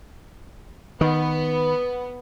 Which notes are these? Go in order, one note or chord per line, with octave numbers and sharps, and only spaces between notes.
D#3 B3